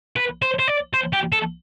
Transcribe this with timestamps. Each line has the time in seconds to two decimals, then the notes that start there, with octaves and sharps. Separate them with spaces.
0.16 B4
0.42 C5
0.59 C5
0.68 D5
0.93 C5
1.13 G4
1.32 A4